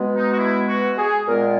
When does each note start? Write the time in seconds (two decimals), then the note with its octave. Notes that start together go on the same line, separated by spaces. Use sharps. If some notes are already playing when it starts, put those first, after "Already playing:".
Already playing: B2 G#3 B3
0.15 D#4
0.32 F#4
0.38 E4
0.68 F#4
0.98 G#4
1.28 A#2 G#3 B3 A#4